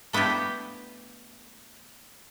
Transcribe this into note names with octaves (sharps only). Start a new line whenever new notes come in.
A3 B3 D4 E4 G4